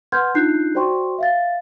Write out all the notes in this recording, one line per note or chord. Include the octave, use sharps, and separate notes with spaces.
B4 F#5 C6 F6 G6 G#6
D4 D#4 F4 F#6 G6 C7
F#4 C5 D5 G5 C6 C#6
E5 F5 A6